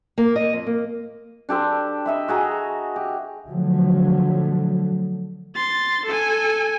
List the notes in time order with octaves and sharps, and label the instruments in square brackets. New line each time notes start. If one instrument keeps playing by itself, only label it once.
[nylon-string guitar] A#3
D#5
F2
A#3
[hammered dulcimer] D4 G4 A4 C5
D#5 E5 B5
F#4 G#4 A#5
G4
[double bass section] D3 F3 F#3 A3
[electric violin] C6 A6
A4 G#5